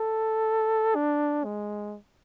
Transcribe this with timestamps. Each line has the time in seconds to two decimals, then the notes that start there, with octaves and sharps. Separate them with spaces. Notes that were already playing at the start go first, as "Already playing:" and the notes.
Already playing: A4
0.95 D4
1.45 G#3